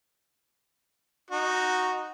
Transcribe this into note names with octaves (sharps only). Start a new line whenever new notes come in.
D#4 F#4